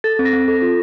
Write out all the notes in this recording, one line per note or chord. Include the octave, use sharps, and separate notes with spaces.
A4 A6
C4
A#6
C4
A4
F4